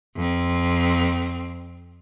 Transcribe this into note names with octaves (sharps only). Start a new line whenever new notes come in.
F2 C4